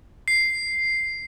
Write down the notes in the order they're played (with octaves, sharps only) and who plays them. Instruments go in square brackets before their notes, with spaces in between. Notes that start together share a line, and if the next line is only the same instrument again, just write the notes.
[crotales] C7